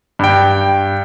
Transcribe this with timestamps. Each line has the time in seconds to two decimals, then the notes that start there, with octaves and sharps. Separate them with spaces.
0.19 G2 G5